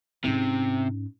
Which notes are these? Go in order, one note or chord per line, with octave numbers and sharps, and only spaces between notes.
G#2 C3 C#4